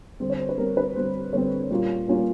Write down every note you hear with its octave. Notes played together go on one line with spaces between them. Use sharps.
D3 G3 C4 C5
C#5
C5
B4
D3 G3 C4 A#4
B4
D3 G3 C4 C5
D3 G3 C4 C#5
A#2 G3 A#3 C#4 F4
A#2 G3 A#3 C#4 F4